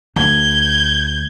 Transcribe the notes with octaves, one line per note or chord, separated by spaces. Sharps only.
D2 G6 G#6